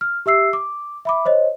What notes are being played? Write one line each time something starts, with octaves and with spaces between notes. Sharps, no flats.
F6
G4 E5 E6 C7
D6
E5 B5 D6
C5 C#5 D#5